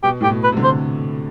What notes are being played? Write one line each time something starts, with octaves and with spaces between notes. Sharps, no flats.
B2 G4
A2 G4
B2
B4
C3
D3
C5